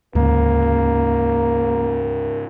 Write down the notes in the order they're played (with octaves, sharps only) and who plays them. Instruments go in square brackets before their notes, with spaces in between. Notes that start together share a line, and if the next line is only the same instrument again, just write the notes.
[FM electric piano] D2 [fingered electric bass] G#2 C#3 [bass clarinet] A#3 [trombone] A#4